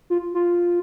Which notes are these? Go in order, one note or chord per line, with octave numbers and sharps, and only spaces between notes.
F4
F4